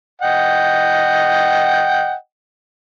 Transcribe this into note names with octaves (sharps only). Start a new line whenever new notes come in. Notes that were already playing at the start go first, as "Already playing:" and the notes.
D#5 F#5 G5